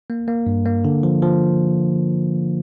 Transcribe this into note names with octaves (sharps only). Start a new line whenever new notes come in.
A#3
A#3
G2
A#3
D3
F3
F3